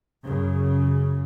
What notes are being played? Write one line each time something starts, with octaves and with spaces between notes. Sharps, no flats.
F#2 C#3